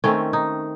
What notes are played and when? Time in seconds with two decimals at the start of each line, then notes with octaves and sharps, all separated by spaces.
0.04 D#3 A3 C4 C#4
0.33 D#4